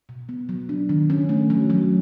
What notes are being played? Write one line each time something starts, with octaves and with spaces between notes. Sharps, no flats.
B2
B3
F#3
D4
D#3
C#4
A3
F#3
F#3